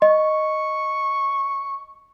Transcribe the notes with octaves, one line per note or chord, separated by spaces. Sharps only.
D#5 C#6